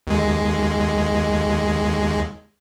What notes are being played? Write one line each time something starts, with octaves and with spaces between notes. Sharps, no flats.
D#2 G#3